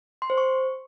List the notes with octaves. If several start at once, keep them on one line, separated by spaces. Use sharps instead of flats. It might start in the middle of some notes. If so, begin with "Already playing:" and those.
C6
C5
C#6